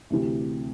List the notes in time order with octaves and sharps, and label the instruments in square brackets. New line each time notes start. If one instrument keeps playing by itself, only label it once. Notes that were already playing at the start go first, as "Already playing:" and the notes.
[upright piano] D2 C3 E3